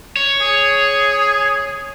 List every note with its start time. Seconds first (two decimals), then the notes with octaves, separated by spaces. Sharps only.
0.17 C#5
0.41 G#4